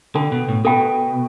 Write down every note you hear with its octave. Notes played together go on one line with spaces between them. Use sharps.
D3 A4 G5 B5
B2
A2
B2 A4 G5 B5